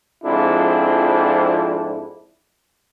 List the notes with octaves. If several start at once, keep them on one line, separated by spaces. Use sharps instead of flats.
F2 G#2 F3 C4 D4 E4